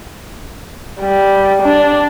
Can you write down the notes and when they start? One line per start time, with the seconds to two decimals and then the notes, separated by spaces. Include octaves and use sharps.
1.01 G3
1.63 D4